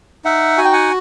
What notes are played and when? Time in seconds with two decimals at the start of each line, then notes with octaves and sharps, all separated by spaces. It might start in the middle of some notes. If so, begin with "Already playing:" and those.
0.25 D#4 E5 F#5
0.58 F#4 G#5
0.65 G5
0.73 F#5 G#5